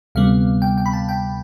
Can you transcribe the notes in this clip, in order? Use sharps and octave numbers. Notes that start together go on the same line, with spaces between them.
D2 C3 G3 B3 F5
G5
G5
B5
A5
G5